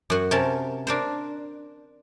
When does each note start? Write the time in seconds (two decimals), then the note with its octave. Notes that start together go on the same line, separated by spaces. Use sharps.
0.10 F#2 F#4
0.31 C3 C#4 A#4 A5
0.87 D4 A#4 C5